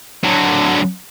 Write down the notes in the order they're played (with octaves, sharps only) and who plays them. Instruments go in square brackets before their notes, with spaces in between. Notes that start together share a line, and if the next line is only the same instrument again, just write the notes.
[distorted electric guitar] D3 F#3